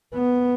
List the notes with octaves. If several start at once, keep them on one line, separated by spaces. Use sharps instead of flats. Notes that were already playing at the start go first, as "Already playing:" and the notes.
B3